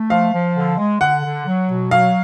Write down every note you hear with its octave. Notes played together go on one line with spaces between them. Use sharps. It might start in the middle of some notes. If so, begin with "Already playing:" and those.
Already playing: A3
F3 F5
F3
D3
G#3
D3 F#5
D3
F#3
B2
F#3 F5